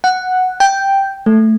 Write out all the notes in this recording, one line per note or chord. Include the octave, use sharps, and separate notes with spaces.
F#5
G5
A3